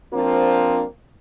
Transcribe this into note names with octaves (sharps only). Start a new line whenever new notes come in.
F3 A#3 C4 D4 F4